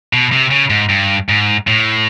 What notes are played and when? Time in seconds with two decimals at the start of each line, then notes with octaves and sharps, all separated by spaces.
0.13 B2
0.32 C3
0.51 C#3
0.70 G#2
0.89 G2
1.29 G#2
1.67 A2